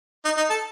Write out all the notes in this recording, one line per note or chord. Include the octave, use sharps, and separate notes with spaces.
D#4
D#4
A4